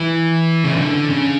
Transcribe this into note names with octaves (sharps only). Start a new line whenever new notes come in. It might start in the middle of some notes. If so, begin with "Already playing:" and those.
Already playing: E3
C#3
D3
C#3